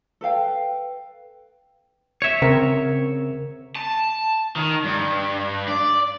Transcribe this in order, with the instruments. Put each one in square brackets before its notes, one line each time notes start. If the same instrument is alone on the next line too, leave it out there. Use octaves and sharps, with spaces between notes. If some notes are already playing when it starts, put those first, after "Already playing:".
[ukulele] A4 B4 F5 G5
[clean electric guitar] C#5 E5
[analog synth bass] C#3 [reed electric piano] C4 A#4
[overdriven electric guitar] A5
D#3
G2
D5